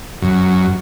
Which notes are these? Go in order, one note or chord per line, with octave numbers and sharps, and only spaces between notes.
F#2